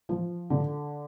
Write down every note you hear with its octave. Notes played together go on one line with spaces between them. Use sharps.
F3
D3